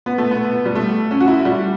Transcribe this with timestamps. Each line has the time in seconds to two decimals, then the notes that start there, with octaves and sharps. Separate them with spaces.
0.06 B3
0.18 A3
0.31 B3
0.66 G3
0.75 A3
1.11 C#4
1.20 F#4
1.28 E4
1.45 G3